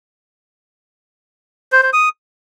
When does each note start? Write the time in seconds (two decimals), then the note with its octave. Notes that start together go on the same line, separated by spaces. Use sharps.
1.72 C5
1.83 C5
1.93 D#6